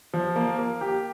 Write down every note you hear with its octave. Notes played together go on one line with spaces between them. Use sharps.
F3
A#3
A#3
G4